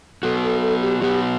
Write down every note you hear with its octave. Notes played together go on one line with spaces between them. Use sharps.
F#3 B3 F#4 A4
A4
A4
G4
F#3 B3 F#4 G4